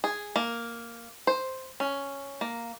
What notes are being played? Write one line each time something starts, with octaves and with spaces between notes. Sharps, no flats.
G#4
A#3
C5
C#4
A#3